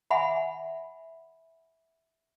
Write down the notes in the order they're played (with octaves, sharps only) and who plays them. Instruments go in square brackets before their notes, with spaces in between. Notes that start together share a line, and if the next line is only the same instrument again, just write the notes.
[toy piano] E5 F#5 G#5 B5